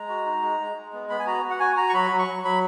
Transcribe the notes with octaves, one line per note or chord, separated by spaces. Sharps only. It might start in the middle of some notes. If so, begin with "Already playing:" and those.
Already playing: G#3 A#5
F#4
D#4
G#3
G#3
G#3
B3
B3 B5
G#5
F#4 A#5
F#4
F#5
F#4 G#5
F#4 A#5
C#6
F#3 B5
F#3
C#6
F#3
F#3 B5